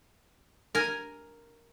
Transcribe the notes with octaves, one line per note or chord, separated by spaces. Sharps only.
A#4 G#5